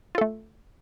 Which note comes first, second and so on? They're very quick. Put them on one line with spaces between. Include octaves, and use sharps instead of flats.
F4 A4 A3